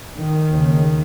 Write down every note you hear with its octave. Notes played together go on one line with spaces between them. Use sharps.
D#3
D#2 C#3